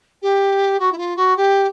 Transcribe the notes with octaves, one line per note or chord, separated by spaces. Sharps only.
G4
F#4
E4
F4
F#4
G4